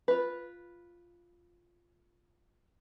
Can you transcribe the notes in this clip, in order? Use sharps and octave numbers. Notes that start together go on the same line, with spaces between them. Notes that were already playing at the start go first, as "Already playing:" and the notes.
F4 B4